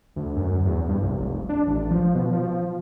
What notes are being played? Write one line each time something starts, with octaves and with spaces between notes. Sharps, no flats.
D2
F#2
E2
G2
C2
F1
D4
A1
F3
B2
F3